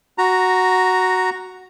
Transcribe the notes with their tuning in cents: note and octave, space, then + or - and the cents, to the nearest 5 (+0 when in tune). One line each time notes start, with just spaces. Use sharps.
F#4 +0 A#5 +0